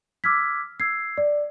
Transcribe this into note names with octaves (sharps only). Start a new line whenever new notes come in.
D6 E6 F6 G#6 B6
E6 G#6 C7
D5